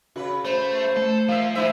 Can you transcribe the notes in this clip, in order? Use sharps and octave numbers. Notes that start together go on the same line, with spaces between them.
C#3 F#4 B4
A3 C5
A3 A4
F3 A#3 E5 F5
E3 G#3 A3 E4 C5 E5